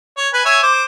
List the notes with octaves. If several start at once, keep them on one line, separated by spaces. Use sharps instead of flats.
C#5
B4 G#5
C#5 E5 G#5
C5 D6